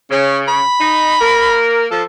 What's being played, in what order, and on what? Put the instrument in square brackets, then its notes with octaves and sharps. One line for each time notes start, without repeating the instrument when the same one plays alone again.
[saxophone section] C#3 [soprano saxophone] C#4
[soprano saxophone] B5
[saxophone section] D#4
A#3 A#4
[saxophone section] F3 [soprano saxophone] A4